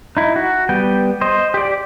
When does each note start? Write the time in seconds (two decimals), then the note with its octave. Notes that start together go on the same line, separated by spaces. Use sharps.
0.17 D#4 E4
0.36 F#4
0.69 G3 B3 G5
1.21 C5 D#5
1.54 G4 D5